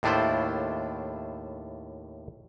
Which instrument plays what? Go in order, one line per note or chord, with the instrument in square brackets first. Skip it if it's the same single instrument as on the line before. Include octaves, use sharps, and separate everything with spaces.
[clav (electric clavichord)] D#2 A2 D4 E4 F4 C5